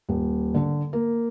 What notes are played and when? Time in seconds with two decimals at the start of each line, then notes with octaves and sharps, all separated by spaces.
0.09 D#1
0.54 D3
0.93 A#3